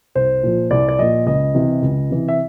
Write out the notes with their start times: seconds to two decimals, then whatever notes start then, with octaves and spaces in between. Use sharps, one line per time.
0.15 C2 C5
0.43 A#2 F3
0.71 C2 D5
0.89 D5
0.99 A#2 F3 D#5
1.26 C#2 D#5
1.55 C3 E3
1.82 C#2
2.10 C3 E3
2.28 E5